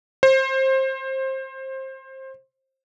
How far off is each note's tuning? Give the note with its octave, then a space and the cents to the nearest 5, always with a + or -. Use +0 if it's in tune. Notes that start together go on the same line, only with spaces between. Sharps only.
C5 +20